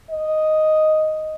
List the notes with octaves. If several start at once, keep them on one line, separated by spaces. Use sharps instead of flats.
D#5